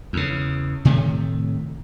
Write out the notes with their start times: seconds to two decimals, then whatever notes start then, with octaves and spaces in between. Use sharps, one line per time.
0.13 E2 C#3
0.85 A2 C3 D#3 A3